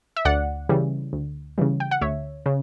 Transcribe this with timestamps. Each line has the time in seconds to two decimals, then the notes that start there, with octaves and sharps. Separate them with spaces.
0.16 E5
0.25 D2 D5 F#5
0.69 C#3 E3 G3
1.13 D2
1.58 C#3 E3 G3
1.80 G5
1.91 F#5
2.01 D2 C#5 E5
2.46 C#3